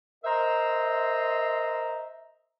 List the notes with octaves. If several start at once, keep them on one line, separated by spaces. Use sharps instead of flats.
A#4 C5 D#5 E5 A#5 C6